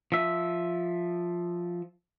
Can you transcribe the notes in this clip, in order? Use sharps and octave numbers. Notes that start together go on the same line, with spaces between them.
F3 E5